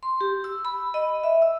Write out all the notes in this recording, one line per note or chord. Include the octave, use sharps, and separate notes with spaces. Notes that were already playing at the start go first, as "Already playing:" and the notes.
C6
G4
E6
B5
D#5
E5
E6